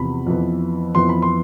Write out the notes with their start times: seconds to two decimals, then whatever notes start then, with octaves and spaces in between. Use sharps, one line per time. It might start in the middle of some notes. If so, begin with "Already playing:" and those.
Already playing: E2 C3 F3 B3 B5
0.27 F2 E3 B3
0.95 F2 E3 B3 C6
1.09 B5
1.22 C6